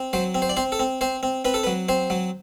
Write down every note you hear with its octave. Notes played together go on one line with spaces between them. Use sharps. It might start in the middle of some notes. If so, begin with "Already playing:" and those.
Already playing: C4
F#3 C5
C4
C5
D5
C4 C5
A4
C4
C4 C5
C4
C4 B4
A4
B4
F#3
C4 C5
F#3